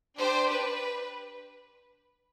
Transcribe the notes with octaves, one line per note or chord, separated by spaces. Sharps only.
D4 G4 C5
B4